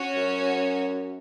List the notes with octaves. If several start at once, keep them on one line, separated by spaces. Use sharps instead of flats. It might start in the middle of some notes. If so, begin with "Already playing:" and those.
Already playing: C#4 F#4 C#5
F#2